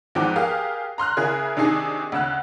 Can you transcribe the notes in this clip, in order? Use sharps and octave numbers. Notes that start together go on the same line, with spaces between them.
E2 G#2 F3 G5 D6 F#6
G4 G#4 A#4 F5
A#5 C6 F6 F#6
C#3 E4 G#4 A#4
C3 D#3 D4 D#4 G#4 C7
D2 C#3 E6 F#6